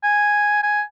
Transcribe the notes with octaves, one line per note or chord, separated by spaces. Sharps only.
G#5
G#5